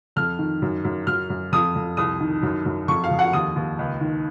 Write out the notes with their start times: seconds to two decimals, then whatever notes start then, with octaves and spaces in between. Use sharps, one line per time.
0.16 F2 F6
0.39 D#3
0.62 F#2
0.84 F#2
1.07 F#2 F6
1.30 F#2
1.52 F2 D#6
1.75 F2
1.97 C2 D#6
2.20 D#3
2.42 F#2
2.65 F#2
2.88 F2 C#6
3.04 F5
3.11 F2
3.19 F#5
3.33 D#2 D#6
3.56 D#2
3.79 C#2
4.01 D#3